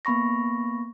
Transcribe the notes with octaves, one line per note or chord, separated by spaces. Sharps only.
A#3 B3 B5 C#6 A#6